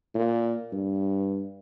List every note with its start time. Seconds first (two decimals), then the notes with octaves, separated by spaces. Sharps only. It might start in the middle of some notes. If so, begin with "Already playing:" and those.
0.15 A#2
0.73 G2